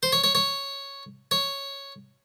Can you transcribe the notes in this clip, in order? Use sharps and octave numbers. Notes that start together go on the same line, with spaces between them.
C5
C#5
C#5
C#5
C#5